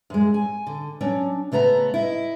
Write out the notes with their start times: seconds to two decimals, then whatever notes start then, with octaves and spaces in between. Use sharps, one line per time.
0.10 F#2 G#3
0.34 G#5
0.67 D3
1.01 F#3 C#4 D4
1.52 C#3 A3 B3 A#5
1.94 E4 D#5